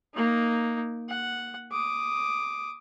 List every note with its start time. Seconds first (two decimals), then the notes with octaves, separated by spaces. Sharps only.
0.14 A#3 D#4
1.09 F#5
1.71 D6 D#6